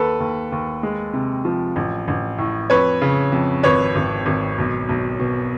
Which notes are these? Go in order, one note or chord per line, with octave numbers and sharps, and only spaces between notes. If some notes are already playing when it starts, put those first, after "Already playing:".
Already playing: D#2 A4 B4
D#2
D#2
G#3
C3
F3
A1
A1
A2
F2 B4 C#5
C#3
F2
G#1 B4 C#5
G#1
G#1
B1
B1
B2